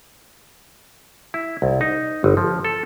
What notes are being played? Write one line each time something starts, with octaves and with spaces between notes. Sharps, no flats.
E4
C2
D#4
G1
F3
A4